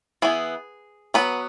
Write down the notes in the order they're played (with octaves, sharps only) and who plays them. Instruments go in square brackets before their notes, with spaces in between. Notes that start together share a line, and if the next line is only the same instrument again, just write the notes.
[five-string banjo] E3 B3 G#4
F#3 B3 B4